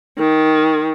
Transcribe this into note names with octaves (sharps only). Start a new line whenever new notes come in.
D#3